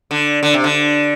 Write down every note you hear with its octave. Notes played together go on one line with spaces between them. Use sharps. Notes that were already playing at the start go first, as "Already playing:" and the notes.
D3
D3
C3
D3